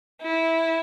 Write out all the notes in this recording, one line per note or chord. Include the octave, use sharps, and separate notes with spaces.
E4